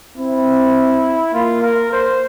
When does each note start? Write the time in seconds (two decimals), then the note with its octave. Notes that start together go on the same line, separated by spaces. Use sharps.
0.17 C4 E4
1.34 A#3 F4
1.63 A#4
1.92 C5